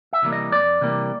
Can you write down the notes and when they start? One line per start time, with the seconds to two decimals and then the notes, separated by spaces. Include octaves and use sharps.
0.13 E5
0.22 C3 E3 G3 A#3
0.33 D#5
0.51 F2 D5
0.81 C3 E3 G3 A#3